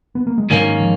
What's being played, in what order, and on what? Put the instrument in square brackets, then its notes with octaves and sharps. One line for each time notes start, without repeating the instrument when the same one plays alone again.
[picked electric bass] B3
A#3
G#3
[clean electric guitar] G#2 D#3 A#3 C#4 [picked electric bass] F#3
[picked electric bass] F3